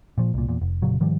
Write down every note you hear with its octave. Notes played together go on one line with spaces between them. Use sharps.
A#2 F3
C2 A#2
E2 A#2
F1
F1 A#2 C#3 F#3
G#2 D#3 F3 G3